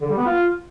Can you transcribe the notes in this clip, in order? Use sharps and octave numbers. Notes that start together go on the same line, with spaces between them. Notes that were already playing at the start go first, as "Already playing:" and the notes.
D3
G3
B3
F4